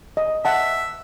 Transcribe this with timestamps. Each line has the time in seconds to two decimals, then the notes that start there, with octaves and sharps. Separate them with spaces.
0.17 D#5
0.45 E5 F#5 A5